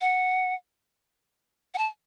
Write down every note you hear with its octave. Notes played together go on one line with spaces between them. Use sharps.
F#5
F#5
A5